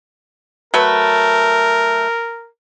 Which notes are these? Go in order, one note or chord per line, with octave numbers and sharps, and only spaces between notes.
F#3 A3 A#4 B4